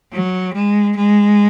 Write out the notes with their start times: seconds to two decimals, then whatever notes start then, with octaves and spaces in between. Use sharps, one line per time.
0.12 F#3
0.54 G#3
0.96 G#3